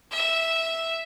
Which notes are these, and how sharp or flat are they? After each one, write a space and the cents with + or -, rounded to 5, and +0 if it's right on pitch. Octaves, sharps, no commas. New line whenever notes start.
E5 -5